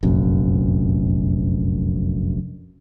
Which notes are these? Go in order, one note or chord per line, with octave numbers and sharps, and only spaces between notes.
F1 A#1 F#2